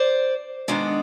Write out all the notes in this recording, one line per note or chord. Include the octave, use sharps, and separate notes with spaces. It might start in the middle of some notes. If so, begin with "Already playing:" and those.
Already playing: C5 D5
D#3 G#3 B3 D4